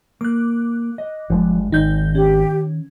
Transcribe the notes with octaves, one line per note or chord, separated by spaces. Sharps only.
A#3 D6 F#6
D#5
G1 G2 F3 G#3
G#1 D#3 D#4 G6
C#4 G4